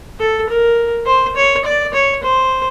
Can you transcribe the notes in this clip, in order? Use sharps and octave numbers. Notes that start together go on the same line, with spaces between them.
A4
A#4
C5
C#5
D5
C#5
C5